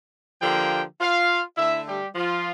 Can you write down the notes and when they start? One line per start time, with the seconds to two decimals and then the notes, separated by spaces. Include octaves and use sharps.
0.40 D3 F3 A#3 G4 G5
0.99 F4 F5
1.57 D3 A3 E4 E5
1.87 G3 G4
2.15 F3 F4